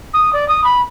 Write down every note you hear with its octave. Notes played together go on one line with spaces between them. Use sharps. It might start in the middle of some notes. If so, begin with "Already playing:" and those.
D#6
D5
D#6
B5